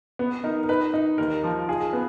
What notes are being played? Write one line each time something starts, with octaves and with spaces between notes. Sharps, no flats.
B3
D#4 A#4
A#4
D#4 B4
D#4
D#2 A#4
F3
F4 G#4
B3